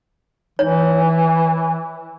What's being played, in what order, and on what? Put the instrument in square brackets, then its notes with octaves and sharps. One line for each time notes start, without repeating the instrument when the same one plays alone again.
[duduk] E3 [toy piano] C#5